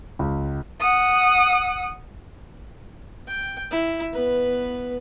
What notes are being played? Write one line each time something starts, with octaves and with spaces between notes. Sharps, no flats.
C#2
F#5 D#6
G5
E4
B3 B4